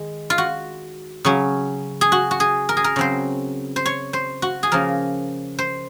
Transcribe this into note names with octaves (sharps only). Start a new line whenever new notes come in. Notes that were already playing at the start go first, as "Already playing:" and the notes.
Already playing: D#3 G#3
F4
F#4
C#3 F#3 C#4
G#4
F#4
F#4
G#4
A#4
G#4
A#4
C#3 F#3 C4 C5
C5
C#5
C5
F#4
G#4
C#3 F3 A#3 A#4
C5